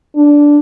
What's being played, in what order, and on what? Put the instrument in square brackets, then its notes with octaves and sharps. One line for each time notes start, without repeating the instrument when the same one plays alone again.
[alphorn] D4